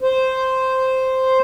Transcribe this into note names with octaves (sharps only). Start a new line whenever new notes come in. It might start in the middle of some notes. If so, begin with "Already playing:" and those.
C5